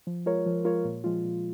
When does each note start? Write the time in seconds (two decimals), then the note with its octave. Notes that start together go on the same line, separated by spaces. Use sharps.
0.07 F3
0.26 G#3 F4 A#4 C#5
0.46 F3
0.65 G#3 F4 A#4 C#5
0.84 A#2
1.04 F3 G#3 F4
1.24 A#2